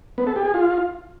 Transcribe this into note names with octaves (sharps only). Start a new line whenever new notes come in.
B3
A4
G4
G#4
F4